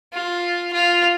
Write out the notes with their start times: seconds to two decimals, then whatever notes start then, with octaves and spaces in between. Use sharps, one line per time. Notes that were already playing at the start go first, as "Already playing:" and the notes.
0.14 F4
0.73 F4